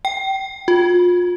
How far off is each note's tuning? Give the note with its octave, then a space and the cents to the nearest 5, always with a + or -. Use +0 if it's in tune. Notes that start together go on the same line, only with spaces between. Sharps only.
G5 -25
F4 +30